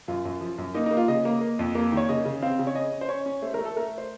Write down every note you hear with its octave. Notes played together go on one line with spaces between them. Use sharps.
F#2 F4
F#2
F3
F#2
A#3 D#4
D#4
A#3
F4
C#3 D#5
A#3
A#3
F2
A#3
D#3 C#5
C#3 D#5
C#3
C4 F5
C#3
C#5
C#4 D#5
C#4
C5
C#4 C#5
C#4
A3 C5
A3 A#4
A4
A3 A#4
C5